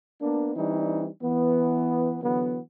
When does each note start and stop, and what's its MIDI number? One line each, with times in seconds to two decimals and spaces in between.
0.21 0.54 58
0.21 0.54 59
0.21 0.54 62
0.55 1.07 52
0.55 1.07 55
0.55 1.07 60
0.55 1.07 62
0.55 1.07 63
1.22 2.17 52
1.22 2.17 59
2.22 2.58 50
2.22 2.58 52
2.22 2.58 54
2.22 2.58 59